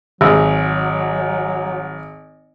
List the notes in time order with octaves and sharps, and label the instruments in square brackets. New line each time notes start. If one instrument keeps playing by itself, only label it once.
[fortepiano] G#1 [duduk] F#3